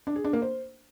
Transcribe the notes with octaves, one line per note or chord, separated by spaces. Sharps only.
D4
G#4
D4
A#3
C5